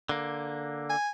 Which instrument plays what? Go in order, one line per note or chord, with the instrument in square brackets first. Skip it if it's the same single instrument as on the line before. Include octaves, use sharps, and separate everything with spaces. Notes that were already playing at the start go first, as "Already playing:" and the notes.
[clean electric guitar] D3 A#3
[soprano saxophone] G#5